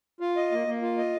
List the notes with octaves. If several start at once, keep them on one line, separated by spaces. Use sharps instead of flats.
F4
D#5
A#3
A#3
F4
D#5